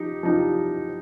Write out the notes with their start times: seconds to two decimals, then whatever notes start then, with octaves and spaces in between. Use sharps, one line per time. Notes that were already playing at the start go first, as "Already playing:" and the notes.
Already playing: F3 D#4 G4
0.23 F3 D#4 G4